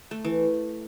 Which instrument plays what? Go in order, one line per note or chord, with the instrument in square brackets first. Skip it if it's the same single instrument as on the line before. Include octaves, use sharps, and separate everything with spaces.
[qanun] A3
E3